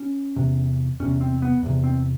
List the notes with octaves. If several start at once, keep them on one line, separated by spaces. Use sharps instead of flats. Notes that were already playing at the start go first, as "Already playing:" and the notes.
Already playing: C#4
E2 C3
E2 C3 C#4
C4
B3
E2 C3
C4